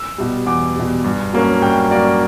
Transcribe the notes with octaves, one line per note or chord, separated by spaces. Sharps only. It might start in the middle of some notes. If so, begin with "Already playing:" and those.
Already playing: E6
B2 G3
E2 D6
B2 G3
G2
F#3 A#3 C#4
G2 G5
F#3 A#3 C#4 D5